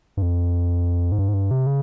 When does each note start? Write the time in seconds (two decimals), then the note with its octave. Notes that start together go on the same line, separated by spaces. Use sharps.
0.17 G2
0.22 F2
1.12 G#2
1.19 G2
1.28 G#2
1.34 G2
1.51 C3
1.67 C#3